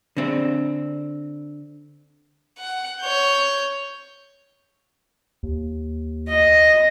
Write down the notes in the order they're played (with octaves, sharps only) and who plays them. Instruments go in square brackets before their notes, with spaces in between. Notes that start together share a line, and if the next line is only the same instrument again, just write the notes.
[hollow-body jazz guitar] D3 C4
[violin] F#5
C#5 G6
[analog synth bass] D#2
[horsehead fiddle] D#5